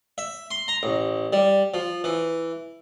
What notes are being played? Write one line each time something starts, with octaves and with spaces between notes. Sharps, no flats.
E5
C6
A#5
A1
G3
F3
E3